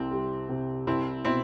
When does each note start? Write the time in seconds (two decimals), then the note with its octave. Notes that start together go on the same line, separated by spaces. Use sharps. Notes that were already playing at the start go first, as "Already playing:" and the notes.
Already playing: C2 C3 C4
0.11 G3
0.49 C3
0.87 C2 C4 E4
1.24 B2 C4 E4